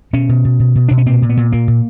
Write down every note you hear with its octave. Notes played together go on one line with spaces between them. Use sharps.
B2 C#4
B2
B2
B2
B2
B2 D4
C#4
A#2 C4
A#2
B3
A#2
A#2 A#3
A#2